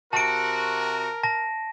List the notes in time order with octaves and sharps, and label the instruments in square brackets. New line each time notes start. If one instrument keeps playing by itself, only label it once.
[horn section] C3 F#4 [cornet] A#4 [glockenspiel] A5 D7
[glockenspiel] A5 A#6